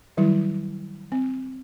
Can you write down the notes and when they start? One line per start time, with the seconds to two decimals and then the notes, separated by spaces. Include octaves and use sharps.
0.17 D#3 F#3 G3 E4
1.12 C4